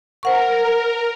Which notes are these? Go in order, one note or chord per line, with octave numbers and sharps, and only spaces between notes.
A#4 C5 F#5 C#6